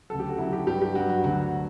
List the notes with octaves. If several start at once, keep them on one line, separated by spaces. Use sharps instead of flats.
D2 C#3 F#3 A4
G4
F#4
D2 C#3 F#3 E4
G4
G2 F#3 G4
G4
G2 F#3 F#4
F#4
D2 D3 F#3 F#4